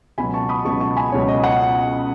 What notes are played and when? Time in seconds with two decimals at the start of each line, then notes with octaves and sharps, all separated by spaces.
0.18 C#2 B2 F#3 G#5 B5
0.34 A5 C#6
0.49 B5 D#6
0.65 C#2 B2 F#3 A5 C#6
0.80 A5 C#6
0.97 G#5 B5
1.12 C#2 B2 F#3 C#5
1.28 D#5
1.43 D#5 F#5